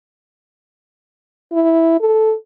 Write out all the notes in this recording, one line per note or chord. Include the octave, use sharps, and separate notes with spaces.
E4
A4